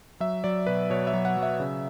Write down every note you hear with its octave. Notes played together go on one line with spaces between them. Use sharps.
F#3 E5
F#3 D5
B2 B4
B2 C#5
E5
F#3
F#5
F#3
E5
C#3